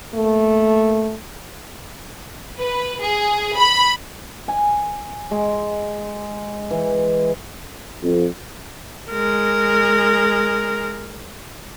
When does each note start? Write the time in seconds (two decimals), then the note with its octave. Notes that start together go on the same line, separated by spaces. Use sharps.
0.14 A3 A#3
2.58 B4
3.01 G#4
3.58 B5
4.48 G#5
5.31 G#3
6.71 E3
8.03 F2
9.11 G#3 A#4